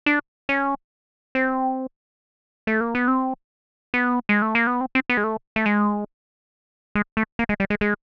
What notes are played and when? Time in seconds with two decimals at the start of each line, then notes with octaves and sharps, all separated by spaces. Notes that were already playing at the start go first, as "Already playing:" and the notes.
0.06 D4
0.49 C#4
1.35 C4
2.67 A3
2.81 A#3
2.95 B3
3.08 C4
3.94 B3
4.29 G#3
4.42 A3
4.55 A#3
4.67 B3
4.81 C4
4.95 C4
5.09 B3
5.17 G#3
5.24 A3
5.56 A3
5.66 G#3
6.95 G#3
7.17 A3
7.39 A#3
7.49 G#3
7.60 G3
7.70 G#3
7.81 G#3